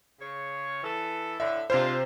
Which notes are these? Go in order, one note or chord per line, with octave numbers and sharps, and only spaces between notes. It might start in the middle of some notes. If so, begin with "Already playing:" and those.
C#3 C#5
E3 A4
A2 D3 E5
C3 G#3 D4 F4 C5